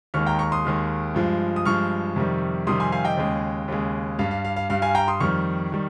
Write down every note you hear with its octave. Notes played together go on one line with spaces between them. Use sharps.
D#2 D#3 G#3 C#6 F6
G5 A#5
A#5 C#6
C6 D#6
D#2 D#3 G#3
G2 F3 G#3
D#6
G2 F3 G#3 C#6 F6
F2 C3 D#3 G3
F2 C3 D#3 G3 C6 D#6
G#5 C6
F5 G#5
D#5 G5
D#2 C#3 G#3
D#2 C#3 G#3
G2 G3 F5
F5
F5
F5
G2 G3 F5
F5 G#5
G5 A#5
C6 D#6
F2 D#3 G3 C#6 F6
D#3 G3